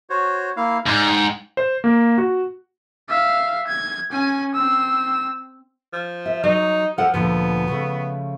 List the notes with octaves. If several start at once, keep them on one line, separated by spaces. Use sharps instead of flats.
F#4 C5 C#5
A#3 E4 F5
G#2 D5 G#5
G5
C5
A#3
F#4
E5 F5
G#6
C#4 G#5
C4 E6
F3
E5
F#3 D#4
F3 A4 F#5
D2 A#2 F3 B3
C#3 F3 A3